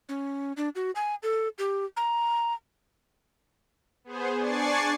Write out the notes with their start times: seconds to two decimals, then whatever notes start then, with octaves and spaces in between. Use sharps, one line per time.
0.09 C#4
0.57 D4
0.75 F#4
0.95 G#5
1.23 A4
1.58 G4
1.97 A#5
4.04 B3 G#4 C5
4.39 D4 D5 G#5 C#6 A6 C7